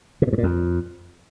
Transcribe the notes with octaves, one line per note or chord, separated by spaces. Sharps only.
C3
B2
G2
A#2
F2